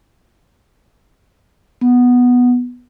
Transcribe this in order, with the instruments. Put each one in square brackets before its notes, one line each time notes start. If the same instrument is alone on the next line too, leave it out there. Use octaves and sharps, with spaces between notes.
[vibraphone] B3